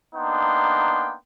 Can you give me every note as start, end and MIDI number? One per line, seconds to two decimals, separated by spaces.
0.15 1.14 58
0.15 1.14 59
0.15 1.14 62
0.15 1.14 63
0.15 1.14 79
0.15 1.14 84